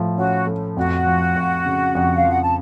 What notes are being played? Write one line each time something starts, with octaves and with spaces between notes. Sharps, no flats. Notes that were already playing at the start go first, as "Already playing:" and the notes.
Already playing: A2 F3 A3
C#4 F#4 F#5
A3
F2 F#4 F#5
F3
F2
C#3
F2
F5
F3 F#5
A5